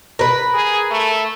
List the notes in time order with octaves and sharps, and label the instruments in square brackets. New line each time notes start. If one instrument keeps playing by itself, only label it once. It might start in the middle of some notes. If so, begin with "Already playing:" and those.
[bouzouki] A#4 B4
[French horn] G#4
A3